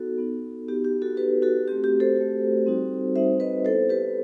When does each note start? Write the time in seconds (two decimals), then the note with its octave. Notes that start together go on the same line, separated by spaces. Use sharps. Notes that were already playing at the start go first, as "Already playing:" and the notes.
Already playing: B3 D#4 F#4 A4
0.18 B3 D#4 F#4
0.68 B3 D#4 F#4 G4
0.85 G4
1.02 F#4 A4
1.17 B3 D#4 F#4 G4 B4
1.42 F#4 A4
1.68 A3 C4 F#4 G4
1.84 G4
2.00 A4 C5
2.16 A3 C4 F#4
2.66 G3 C4 D#4 F#4
3.15 G3 C4 D#4 F#4 C5 E5
3.40 B4 D#5
3.65 B3 E4 A4 C5
3.89 G4 B4